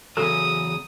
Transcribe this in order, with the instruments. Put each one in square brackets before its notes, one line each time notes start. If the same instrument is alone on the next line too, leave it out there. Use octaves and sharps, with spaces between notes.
[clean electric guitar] E2 C#3 F#3 [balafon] A4 [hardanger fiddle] D#6